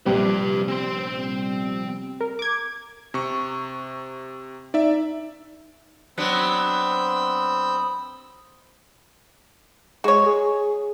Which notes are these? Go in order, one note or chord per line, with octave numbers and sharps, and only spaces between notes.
A#1 C3 G3 G4 B4
C4 C6
A#4
D6 G#6
C3 C#6
D#4 D5 E5
F#3 B3 C4 D4 B5 D#6 E6 G6
G#3 F#4 C#5
G#4